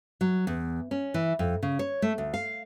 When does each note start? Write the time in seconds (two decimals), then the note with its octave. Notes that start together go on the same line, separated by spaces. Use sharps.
0.21 F#3
0.47 E2
0.91 C#4
1.14 E3
1.39 F2
1.63 C#3
1.79 C#5
2.02 A3
2.18 D2
2.34 F5